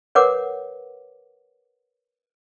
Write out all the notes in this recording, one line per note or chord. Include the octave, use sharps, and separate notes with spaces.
A#4 B4 C#5 F#5 D6